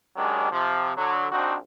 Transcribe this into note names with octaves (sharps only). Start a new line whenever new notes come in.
D#3 F#3 G#3 C#4 D4 G4
C3 F3
D3 F#3
A#1 C4 D4 D#4 F#4